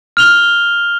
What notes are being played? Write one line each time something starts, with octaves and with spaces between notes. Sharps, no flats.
F6 F7 G7